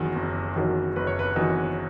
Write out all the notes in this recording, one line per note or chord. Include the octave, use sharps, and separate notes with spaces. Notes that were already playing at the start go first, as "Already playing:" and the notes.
Already playing: F#1 E2 D#3 F#3
F#1
E2 D#3 F#3
F#1 B4
C#5
B4
E2 D#3 F#3